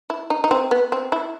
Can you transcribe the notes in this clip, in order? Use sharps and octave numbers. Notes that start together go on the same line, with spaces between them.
E4
D#4
D#4
C4
B3
C4
E4